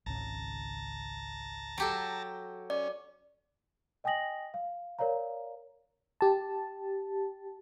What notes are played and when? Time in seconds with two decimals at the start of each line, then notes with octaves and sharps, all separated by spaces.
0.06 G#1 C#2 C#3 A5 A#5
1.78 F#3 G4 A4
2.70 C#4 D5
4.04 D#5 G5 G#5 D#6 A#6 F#7
4.54 F5
4.99 A#4 C#5 D5 F5 A#5
6.21 G4 A5